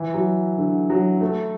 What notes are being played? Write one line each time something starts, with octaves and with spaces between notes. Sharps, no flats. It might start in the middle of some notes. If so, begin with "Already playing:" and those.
Already playing: E3
F#3
D3
F#3
A3